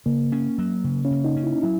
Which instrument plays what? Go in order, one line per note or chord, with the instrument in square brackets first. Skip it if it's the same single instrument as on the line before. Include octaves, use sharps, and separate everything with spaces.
[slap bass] C#3 [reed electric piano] A#3
[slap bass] C#4
F#3
C#3
[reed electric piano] C#4
[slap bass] C#3
[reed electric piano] D#4
[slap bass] C#4
[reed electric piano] E4
D#4
[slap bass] F#3 [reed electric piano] E4